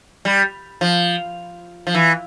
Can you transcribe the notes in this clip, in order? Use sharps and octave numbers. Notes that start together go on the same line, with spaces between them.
G3
F3
F3
E3